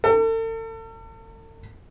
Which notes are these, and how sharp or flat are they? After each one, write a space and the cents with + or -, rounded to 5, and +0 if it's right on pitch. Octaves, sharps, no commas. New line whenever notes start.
A4 +40